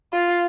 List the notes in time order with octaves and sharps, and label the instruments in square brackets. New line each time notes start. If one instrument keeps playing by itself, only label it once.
[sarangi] F4